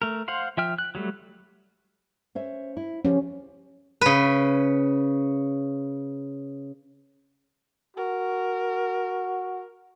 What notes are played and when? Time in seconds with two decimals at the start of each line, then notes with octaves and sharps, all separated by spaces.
0.02 A3 A#4
0.28 C5 F5 F#5 C6
0.57 F3 E5 G5 F6
0.78 F#6
0.95 F#3 G3 A3
2.35 C#4 C5 E5
2.77 E4
3.05 F3 C#4 G4
4.01 C#3 B4
7.97 F#4 A#4